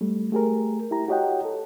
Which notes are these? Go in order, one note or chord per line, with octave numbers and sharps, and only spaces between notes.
G3 A3
A3 G4 G#4 A#4
E4 G4 A#5
F#4 G4 C#5 D#5 F#5 G5
A4